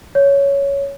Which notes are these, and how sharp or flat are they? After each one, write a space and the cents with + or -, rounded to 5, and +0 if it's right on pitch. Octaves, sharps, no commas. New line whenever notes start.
C#5 +10